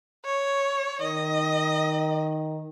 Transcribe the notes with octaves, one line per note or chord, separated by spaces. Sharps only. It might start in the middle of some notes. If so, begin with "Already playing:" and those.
C#5
D#3 D#5